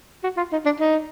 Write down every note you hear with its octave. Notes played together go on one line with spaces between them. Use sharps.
F#4
F4
D#4
D4
D#4